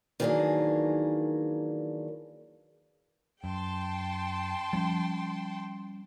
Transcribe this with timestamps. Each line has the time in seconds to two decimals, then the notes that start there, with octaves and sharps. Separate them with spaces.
0.20 D#3 E3 F#3 A#3 D4 G#4
3.44 F#2 G5 A5 C6
4.73 F3 G3 C4 C#4